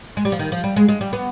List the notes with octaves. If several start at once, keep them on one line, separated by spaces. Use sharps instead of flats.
G#3
G3
F3
D#3
F3
G3
G#3
G#3
G3
B3